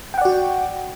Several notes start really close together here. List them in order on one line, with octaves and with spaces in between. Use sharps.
G5 F#5 D5 F#4